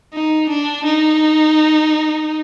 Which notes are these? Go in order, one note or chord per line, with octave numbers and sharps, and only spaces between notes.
D#4
D4
D#4